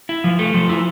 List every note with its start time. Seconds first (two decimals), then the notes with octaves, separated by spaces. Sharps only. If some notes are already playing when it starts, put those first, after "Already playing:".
0.09 E4
0.24 F3
0.39 A3
0.54 F3
0.69 E4